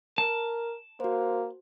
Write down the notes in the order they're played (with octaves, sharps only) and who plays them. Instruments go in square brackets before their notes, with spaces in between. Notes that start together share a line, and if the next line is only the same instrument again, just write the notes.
[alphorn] A#4 [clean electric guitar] A5
[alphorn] A#3 [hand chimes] F#4 C5